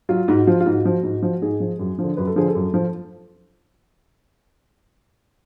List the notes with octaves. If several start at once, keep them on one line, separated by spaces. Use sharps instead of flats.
F#3 F4
G#2 F#4
F3 F4
F4
G#2 F#4
F3
G#2
F3
G#2 G#4
F3
F#2
D3 F3
F#2 B4
A4
D3 F3 G#4
A4
F#2
F3